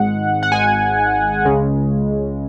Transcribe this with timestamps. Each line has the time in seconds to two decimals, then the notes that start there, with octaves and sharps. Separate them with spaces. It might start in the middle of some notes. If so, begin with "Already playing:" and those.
Already playing: G#1 G#2 G#3 F#5
0.43 F#5
0.52 G#1 G#2 G#3 G#5
1.45 C#2 C#3 G#3